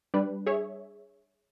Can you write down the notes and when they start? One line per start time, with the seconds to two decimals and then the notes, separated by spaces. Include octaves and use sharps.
0.14 G3 D4 B4
0.47 G#4 C#5 E5